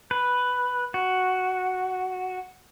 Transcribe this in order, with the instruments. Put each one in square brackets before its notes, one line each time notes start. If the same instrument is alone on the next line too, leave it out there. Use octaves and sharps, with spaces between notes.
[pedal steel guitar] B4
F#4